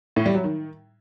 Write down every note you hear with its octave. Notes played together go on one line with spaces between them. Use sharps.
A2
G3
F#3
D#3